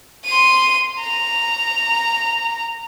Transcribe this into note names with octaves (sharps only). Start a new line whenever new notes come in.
C6 D#7
A#5